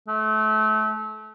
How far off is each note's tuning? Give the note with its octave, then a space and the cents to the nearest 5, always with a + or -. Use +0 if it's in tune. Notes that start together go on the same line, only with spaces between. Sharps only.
A3 -25